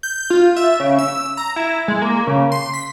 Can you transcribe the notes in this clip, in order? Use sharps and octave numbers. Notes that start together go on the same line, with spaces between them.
G6
F4
E5
C#3
E6
A#5
E4
G#3
A#3
C#3
C6
B6